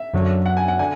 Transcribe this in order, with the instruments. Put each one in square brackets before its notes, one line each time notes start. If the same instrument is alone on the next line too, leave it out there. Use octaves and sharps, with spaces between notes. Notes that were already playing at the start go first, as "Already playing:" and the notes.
Already playing: [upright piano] E5
[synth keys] F#2 D3 F#3
[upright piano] F#5
G#5
F#5
[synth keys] D3 [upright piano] G#5